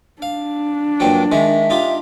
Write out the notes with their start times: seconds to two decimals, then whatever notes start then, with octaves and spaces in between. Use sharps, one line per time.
0.22 D4 F5
1.00 G2 A#2 F#3 G5
1.32 D#3 G#3 E5
1.70 D#4 F4 G4